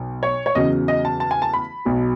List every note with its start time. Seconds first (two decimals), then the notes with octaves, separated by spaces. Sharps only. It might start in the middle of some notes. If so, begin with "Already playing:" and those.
Already playing: B1
0.23 C#5
0.46 C#5
0.55 E2 C#3 F#3 D#5
0.88 D#5
1.05 A5
1.20 A5
1.31 G#5
1.42 A5
1.53 B5
1.85 B1 B2 F#3